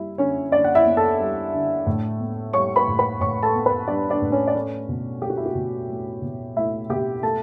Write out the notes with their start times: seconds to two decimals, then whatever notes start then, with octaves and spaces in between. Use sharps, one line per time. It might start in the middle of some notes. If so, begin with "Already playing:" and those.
Already playing: G3 E4
0.18 D3 C#4 C#5
0.52 D3 D4 D5
0.64 F#5
0.75 E4 E5
0.86 B3
0.97 A4 A5
1.19 G3
1.53 D3
1.87 A2
2.20 B3
2.53 G3 C#5 C#6
2.76 B4 B5
2.88 A2
2.99 B4 B5
3.20 A2 C#5 C#6
3.43 A4 A5
3.55 B3
3.66 B4 B5
3.87 G3 D4 D5
4.10 D4 D5
4.22 A2
4.32 C#4 C#5
4.48 D5
4.55 A3 C#4 C#5
4.89 B2
5.22 A3 G4
5.30 F#4
5.37 E4
5.46 F#4
5.55 B2
5.90 A3
6.22 B2
6.56 A3 E4 E5
6.89 B2 G4 G5
7.23 A3 A4 A5